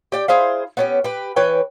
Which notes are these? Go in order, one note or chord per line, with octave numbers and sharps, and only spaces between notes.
G4 D5 G5
E4 G#4 C5 F5
B3 C#4 G4
G4 B4
E3 B4 C#5 G5